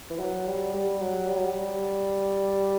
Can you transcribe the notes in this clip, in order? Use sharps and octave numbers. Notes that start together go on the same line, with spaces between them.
E3
F#3
G3
G3
F#3
G3
F#3
G3